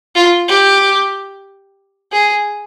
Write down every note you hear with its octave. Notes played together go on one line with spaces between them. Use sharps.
F4
G4
G#4